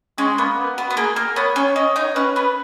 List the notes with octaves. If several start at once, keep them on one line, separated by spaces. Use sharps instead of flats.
G#3 C#4
A#3 B3
B3
B3 F#4
B3
A#3 G#4
A#3 A#4
B3 C#5
C#4 C#5
C#4 D#5
D#4 C#5
C#4 B4
B3 B4